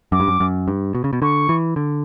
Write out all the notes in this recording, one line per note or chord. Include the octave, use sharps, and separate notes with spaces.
F#2 D6
G2
F#2
F#2
G2
B2
C#3
B2
D3 C#6
E3
D3